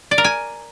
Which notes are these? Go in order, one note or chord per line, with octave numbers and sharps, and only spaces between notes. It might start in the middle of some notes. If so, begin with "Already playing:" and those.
D5
A#4
G#5